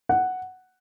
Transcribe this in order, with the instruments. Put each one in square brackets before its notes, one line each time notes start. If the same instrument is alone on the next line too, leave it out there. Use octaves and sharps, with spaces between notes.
[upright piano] F#5